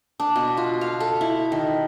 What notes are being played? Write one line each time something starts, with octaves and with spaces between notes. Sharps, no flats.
D4
B2
F4
F5
A4
E4
D#3